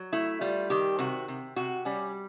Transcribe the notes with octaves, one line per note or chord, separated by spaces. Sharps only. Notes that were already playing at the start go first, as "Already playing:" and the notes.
Already playing: F#3
A3 E4
G3 F4
D#3 G4
C3 F#4
C3
C3 F#4
G3 C#4